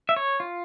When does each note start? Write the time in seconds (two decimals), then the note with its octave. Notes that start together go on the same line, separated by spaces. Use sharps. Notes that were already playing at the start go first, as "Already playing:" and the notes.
0.09 E5
0.16 C#5
0.40 F4